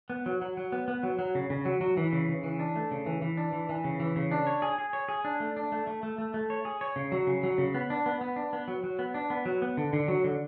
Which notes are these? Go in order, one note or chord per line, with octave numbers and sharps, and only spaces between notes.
B3
F#3
F#3
F#3
B3
B3
F#3
F#3
C#3
C#3
F#3
F#3
E3
C#3
C#3
E3
D4
A3
C#3
E3
E3
D4
E3
E3
C#3
E3
C#3
D4
C#5
G#4
G#4
C#5
G#4
D4
A3
D4
A3
A3
A3
A3
A3
C#5
G#4
C#5
C#3
F#3
C#3
F#3
C#3
B3
D4
B3
B3
D4
B3
F#3
F#3
B3
D4
B3
F#3
B3
D3
D3
F#3
D3